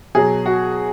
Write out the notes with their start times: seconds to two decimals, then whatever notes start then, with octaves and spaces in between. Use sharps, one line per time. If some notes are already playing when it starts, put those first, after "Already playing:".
0.15 B2 F#3 G#4
0.46 F#4